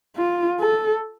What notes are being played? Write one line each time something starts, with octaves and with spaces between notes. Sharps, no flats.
F4
A4